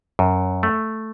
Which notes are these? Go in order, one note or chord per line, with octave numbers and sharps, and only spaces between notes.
F#2
A3